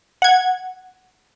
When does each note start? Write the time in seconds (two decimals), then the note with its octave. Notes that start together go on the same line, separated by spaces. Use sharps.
0.22 F#5 G#6